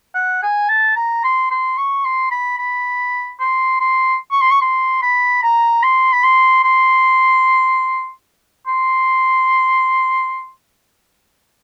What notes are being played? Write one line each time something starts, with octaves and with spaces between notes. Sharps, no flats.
F#5
G#5
A5
A#5
C6
C6
C#6
C6
B5
B5
C6
C6
C#6
C6
C#6
C6
B5
A#5
C6
B5
C6
C6
C6